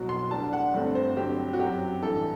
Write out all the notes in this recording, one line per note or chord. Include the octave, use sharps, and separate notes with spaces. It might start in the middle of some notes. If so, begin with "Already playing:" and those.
Already playing: C2 B2 F#3
C6
D2 D3 G3 D4 A5
F#5
G1 G2 D3 A3 C4
C5
G2 F#3 C4 G4
F#4
F#2 F#3 C4 G4
A1 G2 E3 A4